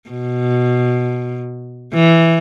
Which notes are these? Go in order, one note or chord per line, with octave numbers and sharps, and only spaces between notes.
B2
E3